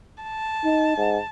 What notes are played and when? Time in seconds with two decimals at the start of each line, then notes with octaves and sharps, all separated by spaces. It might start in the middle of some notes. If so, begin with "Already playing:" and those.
0.23 A5
0.65 D#4
0.98 G#2